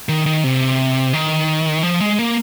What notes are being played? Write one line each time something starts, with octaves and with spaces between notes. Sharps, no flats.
D#3
D#3
C3
D#3
F3
G#3
A#3